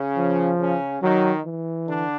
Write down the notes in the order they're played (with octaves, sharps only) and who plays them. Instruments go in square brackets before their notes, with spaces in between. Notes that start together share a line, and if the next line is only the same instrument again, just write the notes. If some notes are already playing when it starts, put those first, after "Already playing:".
Already playing: [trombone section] C#3 C#4
[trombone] F3
[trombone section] C#3 C#4
[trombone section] D#3 D#4 [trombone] F#3
[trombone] E3
[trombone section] D3 D4